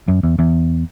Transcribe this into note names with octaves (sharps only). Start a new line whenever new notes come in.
F#2
E2
E2